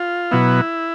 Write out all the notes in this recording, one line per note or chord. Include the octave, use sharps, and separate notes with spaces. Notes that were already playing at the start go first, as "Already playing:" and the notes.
Already playing: F4
B2 F#3 B3 E4